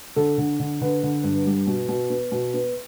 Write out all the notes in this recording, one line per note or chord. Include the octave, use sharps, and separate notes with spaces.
D3 A4
D3
D3
D3 B4
D3
G2
G3
B2
B2
B3
B2
B3